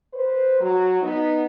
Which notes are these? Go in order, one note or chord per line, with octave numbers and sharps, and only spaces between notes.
B4 C5
F#3
B3 D#4